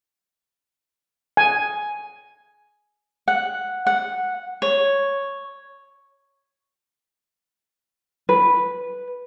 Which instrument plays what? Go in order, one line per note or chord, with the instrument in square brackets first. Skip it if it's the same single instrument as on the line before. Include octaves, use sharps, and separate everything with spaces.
[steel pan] G#5
[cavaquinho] F#5
F#5
C#5
[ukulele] B4